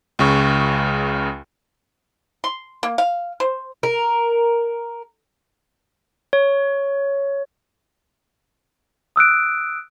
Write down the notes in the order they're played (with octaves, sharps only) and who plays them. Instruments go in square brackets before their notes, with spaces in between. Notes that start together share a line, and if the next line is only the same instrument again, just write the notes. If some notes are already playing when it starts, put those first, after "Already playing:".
[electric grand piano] C#2 C#3 C#6
[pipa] C6
A#3
F5
C5
[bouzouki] A#4
[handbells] C#5
[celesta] D#6 E6 F#6 D7